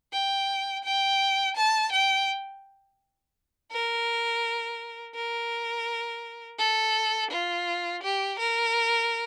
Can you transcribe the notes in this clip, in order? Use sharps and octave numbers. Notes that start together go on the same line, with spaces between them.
G5
G5
A5
G5
A#4
A#4
A4
F4
G4
A#4